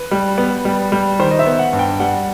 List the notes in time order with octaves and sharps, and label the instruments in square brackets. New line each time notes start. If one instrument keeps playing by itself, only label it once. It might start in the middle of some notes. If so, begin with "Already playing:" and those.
Already playing: [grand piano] B4
G3
B3
G3
G3
D#3 C5
D#5
E5
B3
F#5
G2
G5
G3 F#5